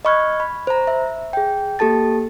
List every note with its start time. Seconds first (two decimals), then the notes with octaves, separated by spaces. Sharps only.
0.05 D#5 B5 C#6 F6 F#6 G#6
0.40 B5
0.67 C5 A#5
0.87 E5
1.33 G#4 G5
1.79 A#3 G4 A4 A5 A6